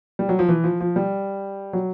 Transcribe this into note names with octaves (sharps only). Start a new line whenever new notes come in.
G3
F#3
F3
E3
F3
F3
G3
F#3